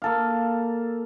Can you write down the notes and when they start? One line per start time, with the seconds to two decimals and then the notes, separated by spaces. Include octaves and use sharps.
0.02 A#3 A4 F5